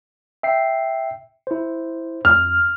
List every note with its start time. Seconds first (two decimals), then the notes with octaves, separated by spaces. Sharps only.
0.43 E5 G5 C7
1.47 E4 C5
2.25 F2 F6